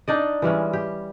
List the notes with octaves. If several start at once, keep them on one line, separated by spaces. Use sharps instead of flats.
D4 D#4 D5 D#5
E3 G3 G#3 C#4
G4